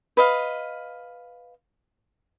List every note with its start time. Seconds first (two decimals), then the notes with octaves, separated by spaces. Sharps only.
0.17 B4 D#5 F5